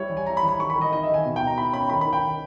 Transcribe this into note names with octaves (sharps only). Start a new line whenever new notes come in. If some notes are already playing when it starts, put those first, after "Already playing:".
Already playing: G3 E4 C#5
E3
G#5
E4 A#5
B5
E3
B5
D#3 C#6
B5
D#3
D#5
D#4 D#5
E5
D#3
G#5
B2
G5
B2
A#5
E4 B5
C#4 B5
D#3 B5
B5
D#3
G5
D#3